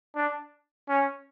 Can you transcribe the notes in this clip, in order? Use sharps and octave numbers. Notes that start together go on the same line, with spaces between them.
D4
C#4